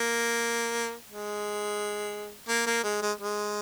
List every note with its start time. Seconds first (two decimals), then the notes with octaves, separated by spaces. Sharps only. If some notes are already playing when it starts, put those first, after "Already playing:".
Already playing: A#3
1.09 G#3
2.48 A#3
2.67 A#3
2.84 G#3
3.02 G#3
3.21 G#3